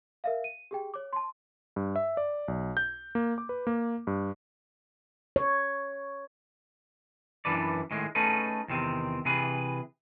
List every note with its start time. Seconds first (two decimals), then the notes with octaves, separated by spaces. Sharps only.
0.24 A#4 E5 F5
0.44 D#7
0.71 G4 G#4 G5
0.94 C#5 D6
1.13 A5 C6
1.76 G2
1.96 E5
2.17 D5
2.48 B1
2.77 G6
3.15 A#3
3.38 D6
3.49 B4
3.67 A#3
4.07 G2
5.36 C#5
7.45 F#2 E3 D4 B4 D5
7.91 A2 D#3 G#3
8.15 A3 C#4 D#4 G#4 A4 B4
8.68 E2 C3 D#3 C4
9.25 C3 E3 G#4 B4